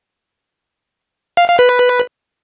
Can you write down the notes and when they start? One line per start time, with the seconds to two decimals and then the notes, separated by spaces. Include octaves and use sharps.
1.37 F5
1.48 F5
1.59 B4